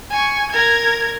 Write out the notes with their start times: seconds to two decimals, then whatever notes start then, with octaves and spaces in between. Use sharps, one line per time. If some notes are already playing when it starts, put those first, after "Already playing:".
0.11 G#5 C#6
0.50 A#4 G#6